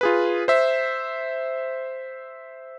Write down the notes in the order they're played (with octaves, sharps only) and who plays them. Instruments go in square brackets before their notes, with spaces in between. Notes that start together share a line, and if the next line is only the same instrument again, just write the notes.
[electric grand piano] F4 G#4 B4
C5 E5